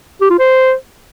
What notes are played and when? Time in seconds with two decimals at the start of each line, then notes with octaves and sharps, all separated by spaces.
0.21 G4
0.30 F4
0.39 C5